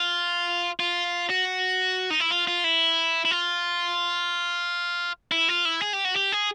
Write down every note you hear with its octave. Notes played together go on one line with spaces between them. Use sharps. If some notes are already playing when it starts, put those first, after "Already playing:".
Already playing: F4
F4
F#4
D#4
E4
F4
F4
E4
E4
F4
E4
F4
E4
G#4
G4
F#4
G4
G#4